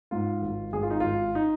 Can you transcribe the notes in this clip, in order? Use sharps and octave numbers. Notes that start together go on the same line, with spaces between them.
G#2 F4
G#1
G#1 G#4
F4
D#4
G#1 F4
D#4